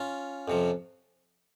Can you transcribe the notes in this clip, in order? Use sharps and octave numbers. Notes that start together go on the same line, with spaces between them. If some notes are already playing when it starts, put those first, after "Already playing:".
Already playing: C#4 F4
F2 C3 F3